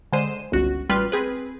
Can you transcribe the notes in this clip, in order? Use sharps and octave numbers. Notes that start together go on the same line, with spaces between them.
D3 G#3 C5 D#7 E7
G1 C#2 F#4
A1 G3 F4 B4 C6 F6
C4 G#4 B4